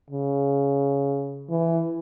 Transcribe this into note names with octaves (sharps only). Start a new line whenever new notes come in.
C#3
E3